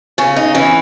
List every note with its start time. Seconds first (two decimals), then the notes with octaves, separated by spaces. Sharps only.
0.18 C#3 C#4
0.36 D#4
0.55 E3 C#4